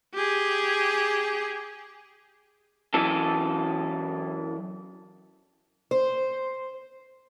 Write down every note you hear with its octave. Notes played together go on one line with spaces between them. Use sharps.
G4 G#4
F#2 E3 A4
C5